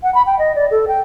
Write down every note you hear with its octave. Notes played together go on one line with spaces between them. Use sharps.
F#5
B5
G5
D#5
D5
A4
G5